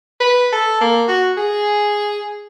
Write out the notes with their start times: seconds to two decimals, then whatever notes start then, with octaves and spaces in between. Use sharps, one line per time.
0.21 B4
0.53 A4
0.81 A#3
1.08 F#4
1.37 G#4